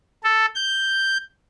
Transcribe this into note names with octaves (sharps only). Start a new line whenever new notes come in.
A4
G6